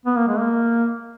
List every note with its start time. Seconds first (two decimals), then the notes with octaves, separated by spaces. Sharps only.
0.06 B3
0.17 A#3
0.28 G#3
0.39 A#3